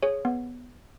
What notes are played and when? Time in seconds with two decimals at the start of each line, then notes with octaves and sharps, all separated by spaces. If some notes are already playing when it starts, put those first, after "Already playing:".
0.03 G#4 C#5
0.25 B3